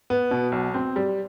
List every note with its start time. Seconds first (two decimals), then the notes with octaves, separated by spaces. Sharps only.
0.10 B3
0.31 B2
0.52 B1
0.74 C4
0.96 G3